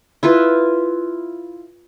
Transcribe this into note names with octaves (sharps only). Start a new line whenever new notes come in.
E4 F4 B4